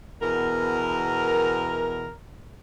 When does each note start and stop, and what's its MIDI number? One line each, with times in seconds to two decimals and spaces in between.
0.22 2.14 40
0.22 2.14 47
0.22 2.14 70